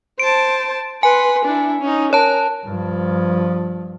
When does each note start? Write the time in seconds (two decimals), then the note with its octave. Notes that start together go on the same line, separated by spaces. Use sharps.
0.19 C5 A5 D7
1.03 B4 G#5 C6
1.45 D4 E4
1.81 C#4 D#4
2.13 A#4 C#5 A5
2.65 G2 F3